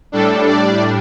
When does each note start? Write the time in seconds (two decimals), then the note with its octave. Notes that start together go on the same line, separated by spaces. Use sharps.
0.12 A2 G3 D4 A4
0.47 D5